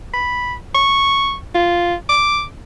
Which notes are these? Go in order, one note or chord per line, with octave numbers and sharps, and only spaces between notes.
B5
C#6
F4
D6